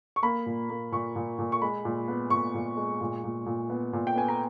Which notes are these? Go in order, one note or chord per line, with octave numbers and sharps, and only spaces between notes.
C#6
A#3 B5
A#2
A#3
A#2 C#6
A#2
A#2
C#6
G#3 B5
A#2
B3
A#2 C#6
A#2
G#3
A#2
A#2
A#2
B3
A#2
G5
B3 G#5
A#5